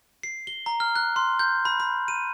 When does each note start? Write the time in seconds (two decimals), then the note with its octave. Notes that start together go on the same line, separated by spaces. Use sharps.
0.23 C7
0.47 G7
0.66 A#5
0.80 F6
0.96 F#6
1.16 C6
1.39 G6
1.65 B5
1.80 B5
2.08 D#7